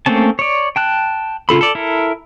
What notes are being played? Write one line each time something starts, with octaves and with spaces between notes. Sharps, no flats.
A3 A#3 C4 C#4 A5
C#5 D5
G5 A5 F#6
C#3 F4 A4 B5
A4 D5
E4 A4 A#4